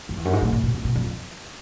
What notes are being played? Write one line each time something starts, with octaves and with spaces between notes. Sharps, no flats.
F2
E2
F#2
G#2
A2
A#2
B2
C3
B2
F2